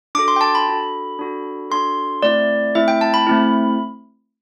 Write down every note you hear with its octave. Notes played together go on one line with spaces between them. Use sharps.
D4 F#4 A4 D6
C6
G5
A5
B5
D4 F#4 A4
D4 F#4 A4
D4 F#4 A4 C6
A3 C4 E4 D5
A3 C4 E4 E5
G5
A5
B5
A3 C4 E4